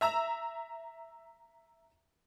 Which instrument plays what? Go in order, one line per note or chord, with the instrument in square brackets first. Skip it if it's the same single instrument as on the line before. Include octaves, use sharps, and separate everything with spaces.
[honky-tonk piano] E5 A#5 E6